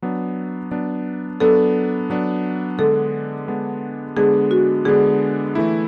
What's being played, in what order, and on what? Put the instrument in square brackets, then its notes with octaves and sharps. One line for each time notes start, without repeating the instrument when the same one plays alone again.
[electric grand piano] F#3 B3 D4
F#3 B3 D4
[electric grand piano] F#3 B3 D4 [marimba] A4
[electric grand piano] F#3 B3 D4
[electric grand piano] D3 G#3 B3 D4 [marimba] A4
[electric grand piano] D3 G#3 B3 D4
[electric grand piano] D3 G#3 B3 D4 [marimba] G#4
[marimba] F#4
[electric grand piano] D3 G#3 B3 D4 [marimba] G#4
[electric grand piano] E3 A3 E4